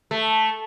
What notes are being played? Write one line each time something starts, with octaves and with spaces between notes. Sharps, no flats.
A3